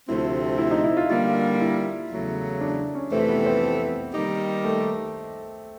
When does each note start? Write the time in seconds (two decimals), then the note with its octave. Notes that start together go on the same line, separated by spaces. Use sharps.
0.08 D2 C3 F3 A3 C4 E4
0.58 E4
0.71 D#4
0.84 E4
0.97 F4
1.10 D3 G3 A#3 F4
1.61 E4
2.11 E2 C#3 F#3 A3
2.61 D4
2.95 C#4
3.12 F2 C3 E3 A3 C4
3.29 B3
3.46 C4
4.13 D#3 G3 A#3 D#4 G4
4.64 A3